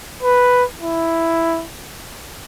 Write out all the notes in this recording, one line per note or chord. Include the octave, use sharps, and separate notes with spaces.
B4
E4